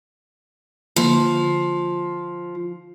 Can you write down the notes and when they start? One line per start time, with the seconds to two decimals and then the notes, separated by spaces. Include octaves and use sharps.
0.96 D3 F3 A#3